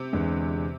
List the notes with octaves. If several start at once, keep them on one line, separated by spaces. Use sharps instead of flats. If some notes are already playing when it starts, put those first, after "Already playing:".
Already playing: C3
E2 D3 G#3